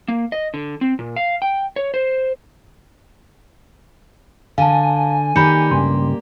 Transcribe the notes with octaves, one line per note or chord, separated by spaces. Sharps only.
A#3
D#5
D3
C4
A#2
F5
G5
C#5
C5
D3 F5 G#5 A5
D#3 A#3 G4 D5 B5 G6 C#7
C#2 G2 C#3 C6